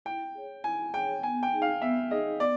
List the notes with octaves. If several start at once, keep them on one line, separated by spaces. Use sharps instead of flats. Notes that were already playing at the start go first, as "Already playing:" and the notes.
E4 G5
G#4 C#5
E4 G#5
G#4 C#5 G5
B3 G#5
G5
D#4 G#4
F5
B3 E5
D#4 G#4 D#5
B3 D5